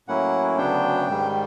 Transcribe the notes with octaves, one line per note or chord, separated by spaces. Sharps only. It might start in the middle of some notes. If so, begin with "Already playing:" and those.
A2 F#3 A#3 C#4 E4 F#5
D2 C#3 F#3 B3 D4 G5
G#2 D#3 G3